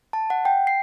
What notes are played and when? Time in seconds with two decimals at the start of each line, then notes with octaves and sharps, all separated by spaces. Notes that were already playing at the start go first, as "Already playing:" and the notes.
0.13 A5
0.30 F#5
0.45 G5
0.67 C7